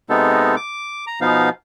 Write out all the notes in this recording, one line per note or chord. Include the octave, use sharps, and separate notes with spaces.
C3 G#3 B3 D#4 A4
D6
A#5
B2 F3 B3 D#4 F5